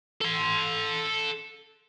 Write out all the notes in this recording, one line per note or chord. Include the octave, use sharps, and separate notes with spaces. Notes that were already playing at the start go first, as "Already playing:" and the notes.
A4 C6